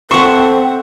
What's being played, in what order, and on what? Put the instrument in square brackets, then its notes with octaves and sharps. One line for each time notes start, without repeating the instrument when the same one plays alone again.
[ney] C4 [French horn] A4 [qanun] E5 F#5 [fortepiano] C6 C#6